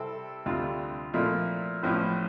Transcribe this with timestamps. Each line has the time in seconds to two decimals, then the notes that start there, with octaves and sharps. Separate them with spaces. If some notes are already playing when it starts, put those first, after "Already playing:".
Already playing: C3 G3 C4 E4 A4
0.46 D2 C3 G3 D4 F4
1.14 A#2 F3 A3 E4
1.83 A1 A2 F3